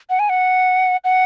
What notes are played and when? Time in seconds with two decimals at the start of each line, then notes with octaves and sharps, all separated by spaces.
0.10 F#5
0.19 G#5
0.29 F#5
1.04 F#5